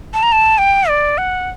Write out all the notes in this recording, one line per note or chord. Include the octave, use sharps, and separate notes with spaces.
A5
A#5
A5
G5
D5
F#5